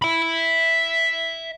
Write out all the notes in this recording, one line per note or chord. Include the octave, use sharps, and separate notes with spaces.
E5 B5